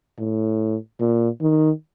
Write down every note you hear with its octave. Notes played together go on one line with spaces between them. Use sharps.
A2
A#2
D#3